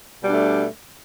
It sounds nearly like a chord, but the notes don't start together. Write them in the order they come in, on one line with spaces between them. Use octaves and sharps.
B2 G3 D4 A3